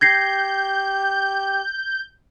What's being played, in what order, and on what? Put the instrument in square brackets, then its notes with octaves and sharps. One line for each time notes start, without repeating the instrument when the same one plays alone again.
[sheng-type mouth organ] G4 [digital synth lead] G6 [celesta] G#6 A#6 C7